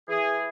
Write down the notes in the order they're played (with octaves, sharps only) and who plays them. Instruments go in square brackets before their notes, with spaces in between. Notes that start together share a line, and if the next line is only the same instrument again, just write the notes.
[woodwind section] E3 G#4